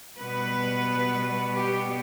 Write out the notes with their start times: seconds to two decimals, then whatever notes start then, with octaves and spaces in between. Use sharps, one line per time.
0.17 B2 G3 B3 B4
1.52 G4